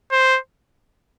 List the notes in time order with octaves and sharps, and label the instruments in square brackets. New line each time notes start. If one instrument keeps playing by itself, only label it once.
[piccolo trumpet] C5